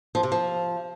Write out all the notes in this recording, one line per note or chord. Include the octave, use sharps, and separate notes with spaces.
F3
C3
F3